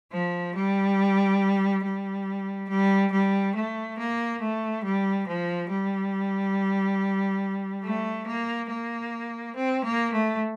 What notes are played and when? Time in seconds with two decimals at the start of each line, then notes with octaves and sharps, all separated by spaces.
0.13 F3
0.55 G3
1.84 G3
2.69 G3
3.12 G3
3.56 A3
3.98 A#3
4.41 A3
4.84 G3
5.28 F3
5.71 G3
7.85 A3
8.27 A#3
8.70 A#3
9.56 C4
9.85 A#3
10.13 A3